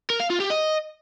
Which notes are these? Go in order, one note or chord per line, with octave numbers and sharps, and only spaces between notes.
A#4
F5
F4
G4
D#5